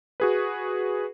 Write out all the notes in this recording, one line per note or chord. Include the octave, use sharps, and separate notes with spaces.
F#4 G#4 B4